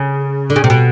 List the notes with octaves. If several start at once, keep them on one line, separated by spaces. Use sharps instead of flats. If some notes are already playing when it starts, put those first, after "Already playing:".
Already playing: C#3
D3
C#3
C3
B2